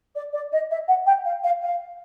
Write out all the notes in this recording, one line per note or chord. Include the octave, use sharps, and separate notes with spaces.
D5
D5
D#5
E5
F#5
G5
F5
F5
F5